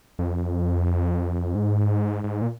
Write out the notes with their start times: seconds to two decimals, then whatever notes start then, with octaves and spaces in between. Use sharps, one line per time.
0.19 F2
1.55 G#2
2.24 G#2
2.42 A#2